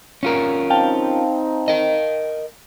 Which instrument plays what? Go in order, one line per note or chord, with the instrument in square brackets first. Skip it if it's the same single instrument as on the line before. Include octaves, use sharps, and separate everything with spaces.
[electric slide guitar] C#4 F4 A#4
[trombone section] C4 D#4 [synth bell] F5 G5 A5
[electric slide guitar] A#4 D#5